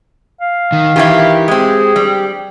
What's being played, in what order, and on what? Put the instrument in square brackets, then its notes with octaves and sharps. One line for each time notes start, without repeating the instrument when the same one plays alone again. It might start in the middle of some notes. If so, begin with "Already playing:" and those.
[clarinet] F5
[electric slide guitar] D#3
[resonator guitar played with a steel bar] D#3 E3 E4 [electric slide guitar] G4
[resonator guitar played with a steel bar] G#3 C4 [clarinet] G#4
[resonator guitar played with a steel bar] G3